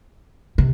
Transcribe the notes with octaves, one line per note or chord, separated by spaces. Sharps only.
C3